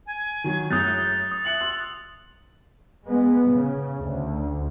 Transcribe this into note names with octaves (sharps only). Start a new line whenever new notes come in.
G#5
D#3 F#3 F#4
F#2 A2 G#3 D#6 F#6 G6 A6
D#6
E5 F#6 C#7 F#7
C6 E6
G#3 B3
C#3
D2